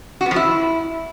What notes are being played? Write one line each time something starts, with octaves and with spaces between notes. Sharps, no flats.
F#4
B3
F3
E4